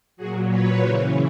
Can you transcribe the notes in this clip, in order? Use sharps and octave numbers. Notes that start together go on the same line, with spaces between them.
A#2 F#3 F#4 G#4
B4 C#5
C#3 E3 A#4 C5